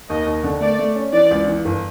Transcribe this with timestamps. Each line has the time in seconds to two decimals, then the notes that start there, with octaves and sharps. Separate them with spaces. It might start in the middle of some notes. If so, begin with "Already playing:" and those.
0.09 D#2 D#5
0.26 D#2
0.44 D3
0.61 A3 D5
0.79 A3
0.95 C#4
1.13 E3 D5
1.31 C#2
1.48 E3
1.65 G1